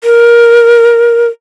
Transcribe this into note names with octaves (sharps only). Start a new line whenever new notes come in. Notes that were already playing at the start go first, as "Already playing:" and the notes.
A#4